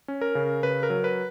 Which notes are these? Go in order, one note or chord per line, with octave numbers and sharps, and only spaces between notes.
C#4
A#4
C#3
C#3 B4
A#4
F#3
B4